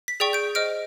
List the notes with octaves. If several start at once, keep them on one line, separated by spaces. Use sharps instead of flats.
B6
G#4 D5 G5 C#6
G6 D7
C5 D#5 F6 D7